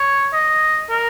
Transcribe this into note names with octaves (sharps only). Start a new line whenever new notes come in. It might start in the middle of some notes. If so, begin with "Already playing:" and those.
Already playing: C#5
D#5
A#4